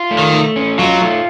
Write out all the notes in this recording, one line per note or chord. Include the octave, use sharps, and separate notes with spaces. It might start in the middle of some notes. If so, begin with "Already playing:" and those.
Already playing: F4
A3
D#3
A3
C#4
F#3 F4
A3